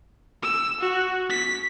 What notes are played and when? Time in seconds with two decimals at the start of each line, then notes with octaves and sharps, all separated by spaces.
0.43 E6
0.81 F#4
1.30 B6